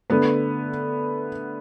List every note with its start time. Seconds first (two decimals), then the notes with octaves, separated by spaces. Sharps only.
0.10 D3 A3 B3 B4